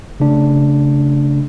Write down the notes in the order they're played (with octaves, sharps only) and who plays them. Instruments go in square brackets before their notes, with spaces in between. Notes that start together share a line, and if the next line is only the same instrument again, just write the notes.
[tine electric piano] C#3 A3 D4